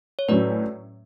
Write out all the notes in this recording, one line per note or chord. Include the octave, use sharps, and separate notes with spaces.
C#5
A2 F#3 C#4 B4 D5